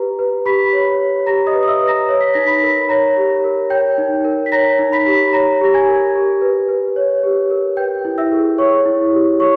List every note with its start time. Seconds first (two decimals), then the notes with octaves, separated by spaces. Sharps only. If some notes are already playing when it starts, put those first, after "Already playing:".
Already playing: G4 B4 A#5
0.19 B4
0.46 G4 B5 B6
0.73 C#5
1.00 C#5
1.26 G4 A#5 A#6
1.47 D#5 D#6
1.53 B4
1.63 D#6
1.68 E5 E6
1.81 B4
1.88 A#5 A#6
2.09 C#5
2.21 B6
2.34 D#4 A#6
2.47 B5 B6
2.63 A#4
2.89 C#5 A#5 A#6
3.17 G4
3.44 A#4
3.70 C#5 G5 G6
3.98 D#4
4.25 A#4
4.46 B6
4.52 C#5 A#5 A#6
4.79 D#4
4.92 B5 B6
5.06 G4
5.33 C#5 A#5 A#6
5.61 G4 A#6
5.74 G#5 G#6
5.88 A#4
6.15 G4
6.42 B4
6.69 B4
6.96 C#5
7.23 G4
7.50 A#4
7.77 B4 G5 G6
8.05 E4
8.18 E5 E6
8.31 G#4
8.58 C#5 C#6
8.86 E4
9.12 G4
9.40 C#5 C#6